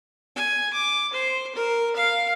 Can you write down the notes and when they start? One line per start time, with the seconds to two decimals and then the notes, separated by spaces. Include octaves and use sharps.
0.36 G#5
0.73 D6
1.13 C5
1.55 A#4
1.96 F5